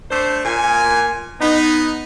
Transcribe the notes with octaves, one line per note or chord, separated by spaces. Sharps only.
A3 D4 C5
A#2 G#5
B3 D#4